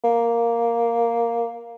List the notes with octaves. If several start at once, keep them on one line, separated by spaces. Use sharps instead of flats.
A#3